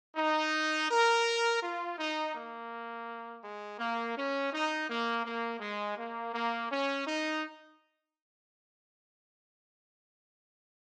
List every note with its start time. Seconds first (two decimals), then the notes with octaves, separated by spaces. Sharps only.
0.16 D#4
0.90 A#4
1.61 F4
1.98 D#4
2.34 A#3
3.43 G#3
3.79 A#3
4.16 C#4
4.52 D#4
4.88 A#3
5.25 A#3
5.60 G#3
5.97 A#3
6.34 A#3
6.70 C#4
7.05 D#4